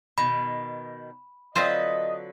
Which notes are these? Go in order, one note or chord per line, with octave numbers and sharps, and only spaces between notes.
B2 D#3 B5
D3 F#3 C4 F4 B4 C5 D#5